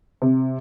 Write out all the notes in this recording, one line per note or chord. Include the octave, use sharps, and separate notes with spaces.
C3